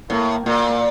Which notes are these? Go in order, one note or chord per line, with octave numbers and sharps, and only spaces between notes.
A2 A#3
A#2 A#3